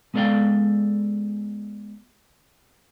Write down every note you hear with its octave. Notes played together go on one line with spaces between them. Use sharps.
G#3 B3 A4 D5 F5 G5